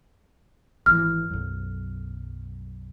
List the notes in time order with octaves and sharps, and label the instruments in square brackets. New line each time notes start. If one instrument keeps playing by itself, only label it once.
[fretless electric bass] G#1 B2 E3 [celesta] F6
[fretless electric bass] B1 F#2